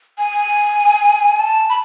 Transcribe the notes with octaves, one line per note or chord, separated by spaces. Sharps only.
G#5
A5
B5